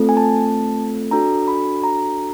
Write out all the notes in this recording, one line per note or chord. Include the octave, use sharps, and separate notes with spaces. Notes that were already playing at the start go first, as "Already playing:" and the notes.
Already playing: A3 C4 F4 A4
G#5
A5
D4 F#4 A4 A#5
B5
A#5